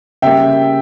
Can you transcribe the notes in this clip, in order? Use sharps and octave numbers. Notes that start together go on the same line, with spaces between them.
C#3 G3 A#3 E5 G5